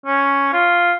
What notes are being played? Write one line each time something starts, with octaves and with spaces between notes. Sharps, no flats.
C#4
F4